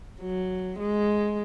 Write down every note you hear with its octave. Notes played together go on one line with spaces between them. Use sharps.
F#3
G#3